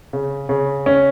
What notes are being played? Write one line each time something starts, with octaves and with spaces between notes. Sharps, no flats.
C#3
C#3
C#4